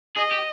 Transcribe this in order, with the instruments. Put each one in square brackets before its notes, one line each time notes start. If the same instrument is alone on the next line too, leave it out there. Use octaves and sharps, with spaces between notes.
[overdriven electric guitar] G#4 [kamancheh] D#5
[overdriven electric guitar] G4